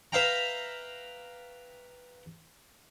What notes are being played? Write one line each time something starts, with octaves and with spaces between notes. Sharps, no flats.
B4 E5 F5 G5 A#5